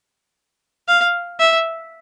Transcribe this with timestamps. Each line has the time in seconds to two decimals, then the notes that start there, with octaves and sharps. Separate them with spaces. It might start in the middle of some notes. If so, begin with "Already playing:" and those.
0.88 F5
1.39 E5